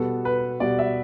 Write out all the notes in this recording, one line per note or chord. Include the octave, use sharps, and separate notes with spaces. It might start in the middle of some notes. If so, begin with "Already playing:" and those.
Already playing: B2 G3 B3 A4
B4
B2 G3 B3 D5
E5